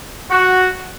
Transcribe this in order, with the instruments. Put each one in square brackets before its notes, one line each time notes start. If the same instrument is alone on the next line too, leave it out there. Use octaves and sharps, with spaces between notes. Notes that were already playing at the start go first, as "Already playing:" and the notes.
[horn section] F#4